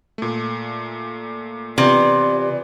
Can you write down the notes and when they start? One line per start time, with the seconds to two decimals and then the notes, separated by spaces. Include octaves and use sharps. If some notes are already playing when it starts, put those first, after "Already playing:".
0.18 A#2 A3
1.78 C3 E3 B3 F4 D5